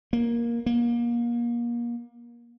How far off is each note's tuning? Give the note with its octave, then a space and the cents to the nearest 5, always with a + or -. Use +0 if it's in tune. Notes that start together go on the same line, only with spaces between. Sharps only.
A#3 +10
A#3 +30